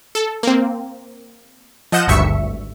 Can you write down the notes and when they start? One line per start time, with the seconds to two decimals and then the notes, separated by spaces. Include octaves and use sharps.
0.15 A4
0.43 A#3 C4
1.92 F3 D#5 F#5 G6 E7
2.08 G#1 D2 G2 E5 C#6 C#7